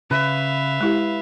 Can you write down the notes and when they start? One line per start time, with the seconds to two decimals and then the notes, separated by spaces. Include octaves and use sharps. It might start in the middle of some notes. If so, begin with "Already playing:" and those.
0.11 C#3 B4 E5 F5
0.81 G#3 E4 G4